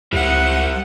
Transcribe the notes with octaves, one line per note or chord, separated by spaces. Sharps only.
C#2 G3 E4 F#5